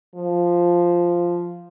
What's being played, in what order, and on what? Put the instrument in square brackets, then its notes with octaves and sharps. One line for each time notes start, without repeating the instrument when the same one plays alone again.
[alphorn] F3